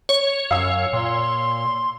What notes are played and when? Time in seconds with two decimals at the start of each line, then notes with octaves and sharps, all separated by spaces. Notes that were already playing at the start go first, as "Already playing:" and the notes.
0.09 C#5
0.51 F#2 F5 E6
0.93 A#2 C6